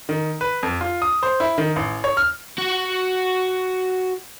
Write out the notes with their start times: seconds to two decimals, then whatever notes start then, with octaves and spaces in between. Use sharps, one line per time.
0.09 D#3
0.41 B4
0.63 F2
0.81 F4
1.02 D#6
1.23 C5
1.40 E4
1.58 D#3
1.76 A1
2.04 C#5
2.17 F6
2.58 F#4 F#5